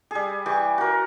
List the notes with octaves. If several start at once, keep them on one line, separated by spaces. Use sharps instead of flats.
G3 G#4
E3 G4 C#6
F#4 A#4